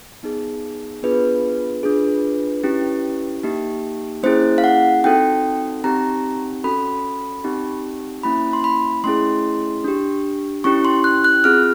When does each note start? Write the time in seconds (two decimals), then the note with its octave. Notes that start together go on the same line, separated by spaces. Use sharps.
0.23 B3 D#4 G#4
1.03 B3 D4 F4 G#4 B4
1.83 D4 F4 G#4
2.64 C#4 E4 G4
3.43 A#3 D#4 G4
4.23 A#3 C#4 E4 G#4 C5
4.58 F5
4.64 F#5
5.04 C4 D#4 F#4 A4 G5
5.84 C4 D#4 G4 A#5
6.64 C#4 F#4 A4 B5
7.44 C4 D#4 G4
8.23 A#3 C#4 E4 B5
8.53 C6
8.64 B5
9.04 A3 C#4 E4 G#4 C6
9.84 D4 G4
10.64 C#4 E4 G4 C#6
10.85 C6
11.04 F#6
11.24 F#6
11.44 C4 F4 G#4 F6